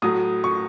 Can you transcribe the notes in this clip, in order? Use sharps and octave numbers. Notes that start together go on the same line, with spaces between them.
A2 F#3 D#6
C#6